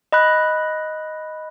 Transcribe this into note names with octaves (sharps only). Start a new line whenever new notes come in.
D#5 B5 F#6